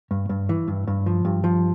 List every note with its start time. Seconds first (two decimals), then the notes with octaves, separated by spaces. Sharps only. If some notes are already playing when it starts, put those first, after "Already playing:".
0.11 G2
0.29 G2
0.49 E3
0.68 G2
0.87 G2
1.06 F3
1.25 G2
1.44 F3